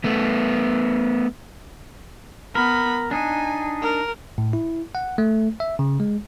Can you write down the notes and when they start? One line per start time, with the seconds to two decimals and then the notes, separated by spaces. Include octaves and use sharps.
0.04 A3 B3
2.55 B3 A#4 B5
3.11 D4 D#4 G#5
3.82 A#4
4.38 A2
4.53 E4
4.95 F#5
5.18 A3
5.60 E5
5.79 C#3
6.00 G#3